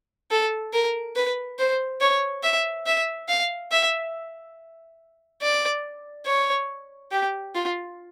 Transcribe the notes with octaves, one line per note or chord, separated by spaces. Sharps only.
A4
A#4
B4
C5
C#5
E5
E5
F5
E5
D5
C#5
G4
F4